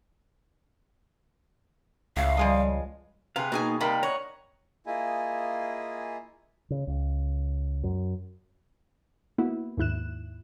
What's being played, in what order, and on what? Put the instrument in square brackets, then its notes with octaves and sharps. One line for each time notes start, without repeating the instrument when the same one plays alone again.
[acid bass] C#2 [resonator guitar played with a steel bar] A2 [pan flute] F5
[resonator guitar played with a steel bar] F3 G#3 D#5 [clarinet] G3
[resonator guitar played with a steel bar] C3 B4 [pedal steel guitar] G#4 F5
[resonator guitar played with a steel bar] B2 G#4 G#5 [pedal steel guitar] A#3 D#4
[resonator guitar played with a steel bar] C3 G3 A#3 [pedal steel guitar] D#4 B5
[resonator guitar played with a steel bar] C#5 [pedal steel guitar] D#5 F#5 A#5
[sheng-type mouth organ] A#3 E4 F4 G#4 D#5 G#5
[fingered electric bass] C#3
C#2
F#2
[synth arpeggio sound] A#3 B3 E4 F#4
D#2 G#2 E4 F#6 E7